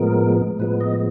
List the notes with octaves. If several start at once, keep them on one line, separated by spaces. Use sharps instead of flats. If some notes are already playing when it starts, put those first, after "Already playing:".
Already playing: A2 F3 G#3 B3 A#4
A2 F3 G#3 B3 B4
D#5